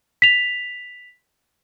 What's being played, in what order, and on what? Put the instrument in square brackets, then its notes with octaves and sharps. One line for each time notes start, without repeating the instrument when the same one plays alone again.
[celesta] B6 F7